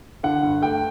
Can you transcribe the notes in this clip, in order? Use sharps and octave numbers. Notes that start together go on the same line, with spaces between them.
D3 F#5
G2
A3 G5